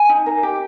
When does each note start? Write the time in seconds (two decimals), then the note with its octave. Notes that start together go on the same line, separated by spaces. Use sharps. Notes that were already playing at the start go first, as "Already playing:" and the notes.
Already playing: G#5
0.09 D#4
0.26 A#4
0.43 G4